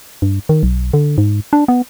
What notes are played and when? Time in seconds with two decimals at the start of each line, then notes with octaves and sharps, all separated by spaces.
0.22 G2
0.49 D#3
0.63 B1
0.94 D3
1.18 G#2
1.53 D4
1.68 B3